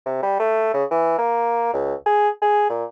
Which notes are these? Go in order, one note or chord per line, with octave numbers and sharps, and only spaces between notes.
C3
G3
A3
C#3
E3
A#3
C#2
G#4
G#4
A#2